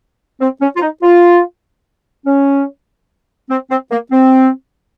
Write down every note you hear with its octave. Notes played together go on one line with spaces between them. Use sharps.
C4
C#4
F4
D#4
F4
C#4
C4
C4
A#3
C4